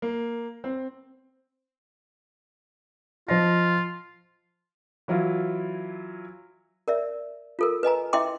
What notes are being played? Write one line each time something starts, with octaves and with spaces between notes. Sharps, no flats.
A#3
C4
F3 F4 D#5 A#6
E3 F#3 E4 F4
A#4 D5 E5
F4 A4 A#4
B4 D#5 G#5 A#5
E4 D#5 E5 G5 C6 D6